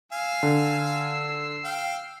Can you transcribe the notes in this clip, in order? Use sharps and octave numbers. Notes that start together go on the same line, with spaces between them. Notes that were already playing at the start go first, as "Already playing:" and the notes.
F5 G#5 E6 C7
D3
F5 G5